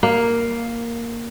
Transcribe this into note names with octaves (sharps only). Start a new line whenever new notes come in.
A#3